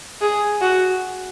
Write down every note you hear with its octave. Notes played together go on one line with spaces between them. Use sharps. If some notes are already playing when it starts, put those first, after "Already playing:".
G#4
F#4